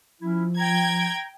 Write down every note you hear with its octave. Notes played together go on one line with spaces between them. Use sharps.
F3 C#4 E4
G5 A#5 G#6